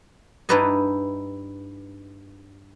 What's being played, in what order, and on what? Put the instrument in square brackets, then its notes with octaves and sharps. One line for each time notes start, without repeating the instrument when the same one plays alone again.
[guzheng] G2 D#4 E4 B4 D5 D#5